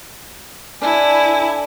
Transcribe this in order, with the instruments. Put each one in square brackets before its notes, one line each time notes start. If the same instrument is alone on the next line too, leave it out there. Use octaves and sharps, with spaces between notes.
[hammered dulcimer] D4 A4 [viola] E4 [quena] G#5